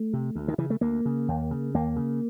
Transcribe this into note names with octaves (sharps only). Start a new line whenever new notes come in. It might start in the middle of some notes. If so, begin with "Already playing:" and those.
Already playing: A3
C3
D2
D#3
C#3 E3
A3
D2 A#3
C#3
D#2
C#3
D#2 A#3
C#3